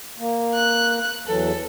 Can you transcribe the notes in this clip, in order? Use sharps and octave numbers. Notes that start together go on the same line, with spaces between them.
A#3
F#6
E2 E3 F#3 A4